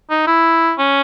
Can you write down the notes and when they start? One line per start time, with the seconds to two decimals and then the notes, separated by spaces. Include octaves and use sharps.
0.10 D#4
0.27 E4
0.78 C#4